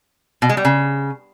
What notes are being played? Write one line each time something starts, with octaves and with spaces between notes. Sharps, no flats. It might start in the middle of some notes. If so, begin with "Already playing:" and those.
B2
G#3
G3
C#3